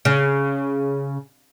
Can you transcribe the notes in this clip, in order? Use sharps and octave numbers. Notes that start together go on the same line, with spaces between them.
C#3